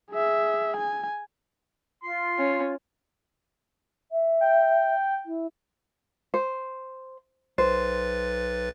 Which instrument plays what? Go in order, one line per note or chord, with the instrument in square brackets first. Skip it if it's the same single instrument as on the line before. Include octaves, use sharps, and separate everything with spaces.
[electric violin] G#4 E5
G#5
[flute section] F4 [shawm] C6
[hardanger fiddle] C#4
[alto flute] E5
[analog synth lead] G5
[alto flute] E4
[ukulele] C5
[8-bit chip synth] B1 B4 A6 [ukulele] C5